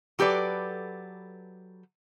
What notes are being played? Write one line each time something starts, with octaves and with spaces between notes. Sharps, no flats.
F#3 G4 A4 B4 D5